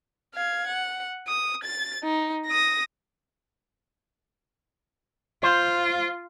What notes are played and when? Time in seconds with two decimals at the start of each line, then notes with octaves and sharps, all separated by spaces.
0.34 F5 G#6
0.67 F#5
1.27 D#6
1.64 A6
2.03 D#4
2.47 D#6 A#6
5.43 F4 C5